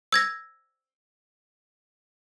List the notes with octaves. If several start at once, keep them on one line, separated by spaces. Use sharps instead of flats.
E6 G#6 A#6